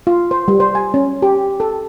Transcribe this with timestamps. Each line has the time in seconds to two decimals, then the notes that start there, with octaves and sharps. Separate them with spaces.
0.07 F4
0.31 C5
0.48 G3
0.60 C5
0.75 G#5
0.94 C#4
1.22 G4
1.60 A4